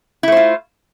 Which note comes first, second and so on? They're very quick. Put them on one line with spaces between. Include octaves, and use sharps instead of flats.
E4 A3 C5 F4